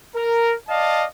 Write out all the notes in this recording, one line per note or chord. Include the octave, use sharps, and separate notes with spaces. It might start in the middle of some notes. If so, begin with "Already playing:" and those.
A#4
D5 D#5 F5 A5